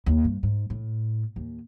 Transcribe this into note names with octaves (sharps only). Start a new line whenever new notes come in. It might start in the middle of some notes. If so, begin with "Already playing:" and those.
D#2
G2
G#2
A2
D#2